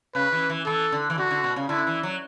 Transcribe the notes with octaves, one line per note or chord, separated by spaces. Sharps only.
C#3 B4
E3
E3
E3 A4
D3
E3
D3 F#4
D3
B2
C#3
D3 E4
E3
F#3